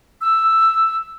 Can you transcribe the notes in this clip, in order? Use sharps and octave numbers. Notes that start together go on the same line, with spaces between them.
E6